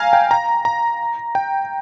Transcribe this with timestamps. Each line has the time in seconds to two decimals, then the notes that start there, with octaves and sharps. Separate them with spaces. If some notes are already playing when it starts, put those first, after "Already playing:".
Already playing: F5 G#5 A#5
0.13 G5
0.31 A#5
0.65 A#5
1.35 G5